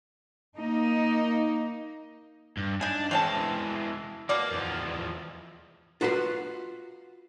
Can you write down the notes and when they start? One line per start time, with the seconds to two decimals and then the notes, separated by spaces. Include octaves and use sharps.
0.55 A#3 D#4
2.57 G2
2.81 D4 D#4 G#5
3.11 E3 G#3 C4 C#4 A5
4.29 B2 A#3 D5
4.51 E2 F3
6.01 F4 F#4 B4 F#5 B5 C6